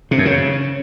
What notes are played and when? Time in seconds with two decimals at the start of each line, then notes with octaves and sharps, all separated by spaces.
0.11 C3
0.18 F#2
0.25 C#3